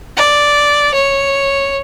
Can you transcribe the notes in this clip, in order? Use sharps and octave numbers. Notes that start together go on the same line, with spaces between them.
D5
C#5